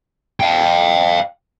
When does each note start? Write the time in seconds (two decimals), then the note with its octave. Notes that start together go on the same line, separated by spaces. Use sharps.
0.40 F5 G5